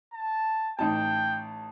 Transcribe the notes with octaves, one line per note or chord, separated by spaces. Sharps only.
A5
A1 D#4 G5 A5